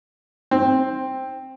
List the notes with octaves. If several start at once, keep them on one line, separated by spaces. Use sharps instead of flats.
C4